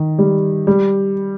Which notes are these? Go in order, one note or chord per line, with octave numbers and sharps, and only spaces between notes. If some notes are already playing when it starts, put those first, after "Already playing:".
Already playing: D#3
G3
G3